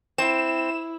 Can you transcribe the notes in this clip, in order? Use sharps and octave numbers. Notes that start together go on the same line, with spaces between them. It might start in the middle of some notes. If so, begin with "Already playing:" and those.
C4 E4 E7